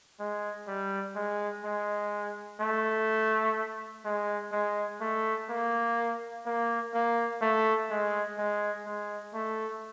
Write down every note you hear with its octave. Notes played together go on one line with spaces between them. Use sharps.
G#3
G3
G#3
G#3
A3
G#3
G#3
A3
A#3
A#3
A#3
A3
G#3
G#3
G#3
A3